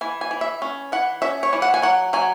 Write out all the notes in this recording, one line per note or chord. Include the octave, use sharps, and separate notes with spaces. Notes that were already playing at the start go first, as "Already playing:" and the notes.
E3 G#5
G#5
E3
E5
C#4
E3 F#5
C#4 E5
C#5
E3
F#5
G#5
F#3 F#5
F#3 G#5